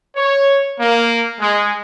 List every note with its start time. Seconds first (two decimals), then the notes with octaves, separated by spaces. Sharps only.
0.16 C#5
0.80 A#3
1.41 G#3